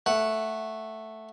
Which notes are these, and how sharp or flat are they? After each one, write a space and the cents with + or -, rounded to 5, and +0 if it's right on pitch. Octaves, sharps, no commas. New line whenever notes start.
A3 +0 F#5 +0